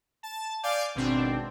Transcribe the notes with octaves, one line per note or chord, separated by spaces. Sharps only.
A5
D5 F5 G#5 D6 G6
G#1 B2 C4 D4